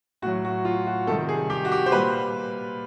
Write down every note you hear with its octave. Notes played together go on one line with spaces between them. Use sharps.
A2 F#3 F#4
F#4
F4
F#4
C3 D#3 G3 A4
G#4
G4
F#4
G4
C5
A#2 G3 B4